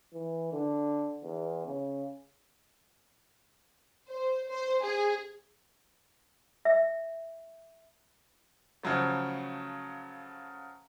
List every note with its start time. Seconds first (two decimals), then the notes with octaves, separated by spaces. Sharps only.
0.14 E3
0.53 D3
1.24 E2
1.67 C#3
4.10 C5
4.49 C5
4.83 G#4
6.65 E5
8.83 C#3 F3 F#3 A3